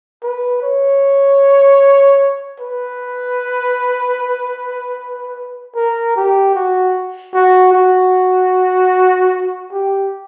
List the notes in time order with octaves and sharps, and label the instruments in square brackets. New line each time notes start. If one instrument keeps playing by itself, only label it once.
[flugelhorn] B4
C#5
B4
A#4
G4
F#4
F#4
F#4
G4